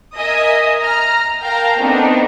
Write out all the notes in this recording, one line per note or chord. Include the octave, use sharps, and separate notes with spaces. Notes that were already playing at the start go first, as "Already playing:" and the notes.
A#4 D#5 E5 G#5 D#6
A#5 F6
A#4 F5 G5 A5 A#5
A3 B3 C4 D4 D#4